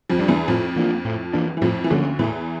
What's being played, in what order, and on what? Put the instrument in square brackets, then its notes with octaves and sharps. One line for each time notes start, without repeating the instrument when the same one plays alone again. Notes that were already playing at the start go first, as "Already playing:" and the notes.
[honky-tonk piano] F2 F3
[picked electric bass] G3 D4
[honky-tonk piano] E2 E3
[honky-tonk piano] F2 F3 [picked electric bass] A2
[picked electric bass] E3 A#3 D4
A2
E3 A#3 D4
[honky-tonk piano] E3
[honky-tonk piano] F2 F3 [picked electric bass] A2
[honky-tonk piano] E3
[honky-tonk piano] D2 D3 [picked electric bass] F3 A#3 C#4
[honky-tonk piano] E2 E3 [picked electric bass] A2